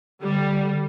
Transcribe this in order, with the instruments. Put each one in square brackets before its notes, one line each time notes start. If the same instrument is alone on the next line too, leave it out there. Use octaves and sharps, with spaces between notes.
[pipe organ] D3 [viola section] G3